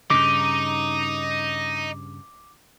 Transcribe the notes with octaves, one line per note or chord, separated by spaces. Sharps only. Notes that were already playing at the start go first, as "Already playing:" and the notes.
G2 C#3 D#4 D6